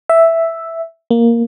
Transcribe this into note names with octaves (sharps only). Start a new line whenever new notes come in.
E5
A#3